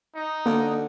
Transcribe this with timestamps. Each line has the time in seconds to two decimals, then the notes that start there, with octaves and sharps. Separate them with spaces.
0.15 D#4
0.46 D3 A#3